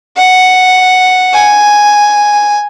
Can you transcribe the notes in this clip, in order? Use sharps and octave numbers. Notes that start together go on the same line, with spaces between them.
F#5
G#5